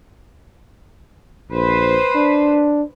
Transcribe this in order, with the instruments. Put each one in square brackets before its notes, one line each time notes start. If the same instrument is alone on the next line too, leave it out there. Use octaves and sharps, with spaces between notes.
[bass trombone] A#1 [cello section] B4 C5
[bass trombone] D4